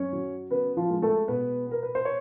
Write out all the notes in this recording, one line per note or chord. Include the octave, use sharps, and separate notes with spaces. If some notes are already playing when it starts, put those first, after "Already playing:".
Already playing: F#2 C#4 C#5
F#3
C#3 B3 B4
F3 F4
G#3
A3 A4
B2 B3 B4
B3 A#4
B4
C5
C#5